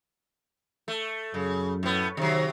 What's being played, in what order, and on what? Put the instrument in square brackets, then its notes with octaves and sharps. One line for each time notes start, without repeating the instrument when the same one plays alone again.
[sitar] A3
[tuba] F#2 [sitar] C#3
[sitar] A2 B3
[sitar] C3 F#3 [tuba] D#3